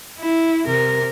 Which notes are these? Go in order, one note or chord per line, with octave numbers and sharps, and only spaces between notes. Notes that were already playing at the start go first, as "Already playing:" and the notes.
E4
C3 A#4